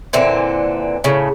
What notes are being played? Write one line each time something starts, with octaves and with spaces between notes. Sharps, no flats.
A#2 D3 E3 C4
A2 C#3